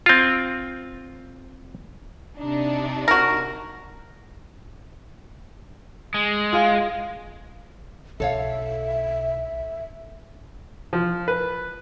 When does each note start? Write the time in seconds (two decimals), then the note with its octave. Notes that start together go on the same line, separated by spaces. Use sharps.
0.06 C4 F4
2.39 C3 D4 D#4
3.08 F#4 A#4
6.14 G#3
6.53 F4 G#4 F5
8.20 B1 A4 C#5 E5 F5
10.93 F3
11.28 B4